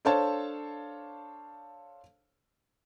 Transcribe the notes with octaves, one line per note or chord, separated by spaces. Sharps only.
D4 A4 C5 C#5 F5 A5